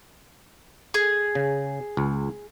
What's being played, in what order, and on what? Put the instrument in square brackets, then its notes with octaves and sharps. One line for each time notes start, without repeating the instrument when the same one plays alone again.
[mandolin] G#4
[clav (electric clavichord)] C#3
C#2